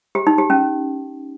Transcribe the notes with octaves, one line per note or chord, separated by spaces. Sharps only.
G4
D#4
G4
C#4